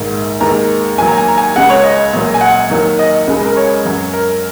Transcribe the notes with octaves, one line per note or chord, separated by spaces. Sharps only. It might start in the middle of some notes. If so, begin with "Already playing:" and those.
Already playing: A#1 G#2 D#3
D#2 D#3 G#3 A#5
D#2 D#3 F#3 G#5
A#5
G#5
A#5
G#5
C#2 C#3 G#3 F#5
C#5
D#5
A#1 A#2 F#3
G#5
F#5
D#2 D#3 F#3
D#5
C#2 C#3 G#3
A#4
C#5
F#2 F#3
A#4